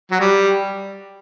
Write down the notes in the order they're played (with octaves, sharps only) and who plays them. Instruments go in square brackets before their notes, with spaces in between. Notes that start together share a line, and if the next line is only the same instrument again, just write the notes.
[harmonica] F#3
G3